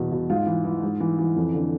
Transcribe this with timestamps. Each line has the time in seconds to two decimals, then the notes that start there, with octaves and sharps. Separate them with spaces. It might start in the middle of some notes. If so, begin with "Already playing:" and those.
Already playing: E2 B2
0.12 B2
0.30 G#2 F4
0.46 E3
0.64 E3
0.83 G#2
1.00 E3
1.18 E3
1.36 F2
1.54 D3